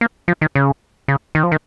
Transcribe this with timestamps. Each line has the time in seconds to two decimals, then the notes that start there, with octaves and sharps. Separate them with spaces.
0.01 A#3
0.28 F3
0.41 D#3
0.55 C#3
1.08 C#3
1.35 D#3
1.43 F3
1.52 D#3